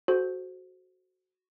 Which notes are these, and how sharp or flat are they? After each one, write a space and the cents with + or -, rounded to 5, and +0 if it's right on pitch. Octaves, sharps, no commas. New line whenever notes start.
F#4 +0 A4 -35 C5 +0